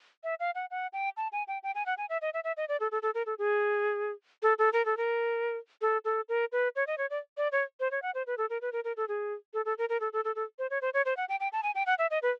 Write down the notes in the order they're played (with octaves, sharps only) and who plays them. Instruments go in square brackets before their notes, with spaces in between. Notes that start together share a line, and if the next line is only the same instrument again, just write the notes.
[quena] E5
F5
F#5
F#5
G5
A5
G#5
G5
G5
G#5
F#5
G#5
E5
D#5
E5
E5
D#5
D5
A4
A4
A4
A#4
A4
G#4
A4
A4
A#4
A4
A#4
A4
A4
A#4
B4
C#5
D#5
C#5
D5
D5
C#5
C5
C#5
F#5
C5
B4
A4
A#4
B4
A#4
A#4
A4
G#4
A4
A4
A#4
A#4
A4
A4
A4
A4
C5
C#5
C5
C#5
C5
F#5
G5
G5
A5
G#5
G5
F#5
E5
D#5
B4